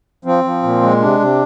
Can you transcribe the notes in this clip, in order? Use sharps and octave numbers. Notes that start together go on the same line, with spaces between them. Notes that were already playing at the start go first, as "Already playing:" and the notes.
F3 C4
F3
A#2
G#3
C3 D4
C3